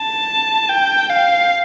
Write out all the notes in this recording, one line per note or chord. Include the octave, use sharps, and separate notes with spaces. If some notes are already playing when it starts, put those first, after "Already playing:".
Already playing: A5
G5
F5